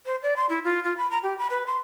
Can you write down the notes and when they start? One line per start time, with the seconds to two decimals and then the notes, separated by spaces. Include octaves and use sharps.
0.05 C5
0.22 D5
0.36 C6
0.49 E4
0.64 F4
0.83 F4
0.97 B5
1.11 A#5
1.23 G4
1.38 B5
1.50 B4
1.66 C6